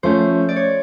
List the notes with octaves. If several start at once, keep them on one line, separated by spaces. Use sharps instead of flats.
F3 A3 C#4 C5
D5
C#5